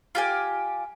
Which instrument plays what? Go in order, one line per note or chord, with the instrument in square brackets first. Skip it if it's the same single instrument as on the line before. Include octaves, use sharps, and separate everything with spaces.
[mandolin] F4 G4 G#5